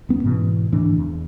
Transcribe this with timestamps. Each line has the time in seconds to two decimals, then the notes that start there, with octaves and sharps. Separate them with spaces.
0.09 D#1 B3 C#4
0.23 G#2 B2 E3
0.72 D2 G#2 E3 D4
0.98 E2